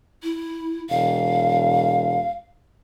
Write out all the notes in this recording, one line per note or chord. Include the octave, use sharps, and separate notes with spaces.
E4
E1 F5